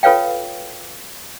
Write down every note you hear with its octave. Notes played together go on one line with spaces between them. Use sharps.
F4 A4 B4 C#5 F5 G5